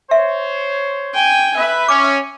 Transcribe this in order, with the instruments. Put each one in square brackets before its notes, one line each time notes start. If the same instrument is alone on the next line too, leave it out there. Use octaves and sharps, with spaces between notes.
[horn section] C5 C#5 [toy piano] E5
[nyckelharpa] G5 G#5
[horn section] B4 [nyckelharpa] E5
[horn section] C#4 [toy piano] D6